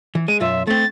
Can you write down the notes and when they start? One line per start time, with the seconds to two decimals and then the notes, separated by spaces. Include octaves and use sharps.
0.15 E3
0.28 G#3 D#7
0.40 B1 F#2 F4 E5
0.67 A3 C4 A6